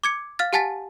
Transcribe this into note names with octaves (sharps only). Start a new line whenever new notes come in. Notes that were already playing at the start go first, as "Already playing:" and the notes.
D6 G#6 C#7
F5 F6 A6
G4 F#5 G#5 A5 A6 B6